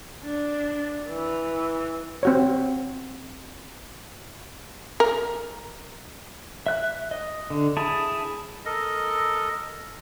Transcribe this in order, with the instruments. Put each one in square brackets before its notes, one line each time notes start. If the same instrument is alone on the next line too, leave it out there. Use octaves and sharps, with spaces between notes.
[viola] D4
E3
[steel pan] C4 F#4 C#5
[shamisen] A#4
[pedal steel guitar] E5 F#6
D#5
D3
E4 G#4 A5
[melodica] A4 A#4 D#5